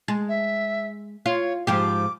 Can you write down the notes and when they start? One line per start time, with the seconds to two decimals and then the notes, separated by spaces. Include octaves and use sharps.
0.08 G#3
0.29 E5
1.26 F4 C#5
1.67 G#2 F3 G4 D6